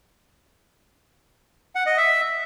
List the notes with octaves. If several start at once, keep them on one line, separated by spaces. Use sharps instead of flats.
F#5
D#5
E5